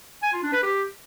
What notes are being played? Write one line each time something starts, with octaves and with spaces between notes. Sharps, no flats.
G#5
F4
D4
B4
G4